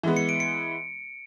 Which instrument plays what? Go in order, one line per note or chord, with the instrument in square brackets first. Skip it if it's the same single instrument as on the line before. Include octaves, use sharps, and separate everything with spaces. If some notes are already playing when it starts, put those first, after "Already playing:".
[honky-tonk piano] E3 G#3 B3
[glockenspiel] C#7
D7
C#7